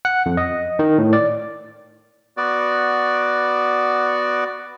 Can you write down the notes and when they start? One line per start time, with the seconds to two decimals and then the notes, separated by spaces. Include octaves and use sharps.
0.05 F#5
0.26 F2
0.37 D#5
0.79 D#3
0.98 A2
1.13 D5
2.37 B3 F#4 D5